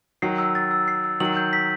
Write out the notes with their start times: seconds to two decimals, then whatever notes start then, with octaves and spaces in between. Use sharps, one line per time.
0.22 D#3 F#3 C7
0.38 E6
0.55 A6
0.71 E6
0.88 C7
1.04 E6
1.20 D#3 F#3 F#7
1.37 G6
1.53 B6